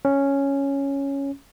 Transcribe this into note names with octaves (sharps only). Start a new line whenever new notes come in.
C#4